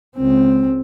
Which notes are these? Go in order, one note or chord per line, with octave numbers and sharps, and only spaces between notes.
C#2 C4